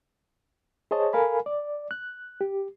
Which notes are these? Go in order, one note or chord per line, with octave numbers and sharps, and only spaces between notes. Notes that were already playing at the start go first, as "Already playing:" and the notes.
G#4 C5 C#5 D#5 A5
A4 A#4 F5 G#5 B5
D5
F#6
G4